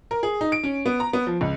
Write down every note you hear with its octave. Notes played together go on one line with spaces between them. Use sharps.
A#4
G#4
D#4
D7
C#4
B3
A#5
B3
F3
C#2